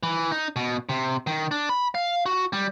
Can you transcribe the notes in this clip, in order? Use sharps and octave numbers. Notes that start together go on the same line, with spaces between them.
E3
D#4
B2
C3
D#3
D4
B5
F5
F#4
G3